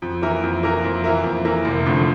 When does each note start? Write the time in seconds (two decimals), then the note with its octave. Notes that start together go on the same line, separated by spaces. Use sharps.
0.02 F2
0.22 E3 A#3 E4 A#4
0.43 F2
0.63 E3 A#3 E4 A#4
0.84 F2
1.04 E3 A#3 E4 A#4
1.24 F2
1.45 E3 A#3 E4 A#4
1.65 F1
1.86 F2 D3 A3